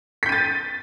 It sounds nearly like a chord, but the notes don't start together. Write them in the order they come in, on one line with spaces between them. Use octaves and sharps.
B6 G6 D#7 A6